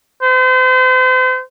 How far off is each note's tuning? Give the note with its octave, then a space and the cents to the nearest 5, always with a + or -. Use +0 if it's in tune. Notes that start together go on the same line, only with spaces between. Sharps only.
C5 -40